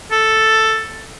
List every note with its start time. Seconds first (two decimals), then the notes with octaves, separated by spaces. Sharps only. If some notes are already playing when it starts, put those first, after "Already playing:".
0.11 A4